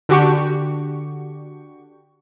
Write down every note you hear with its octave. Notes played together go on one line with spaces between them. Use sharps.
D3 D4 F#4 G4 C#6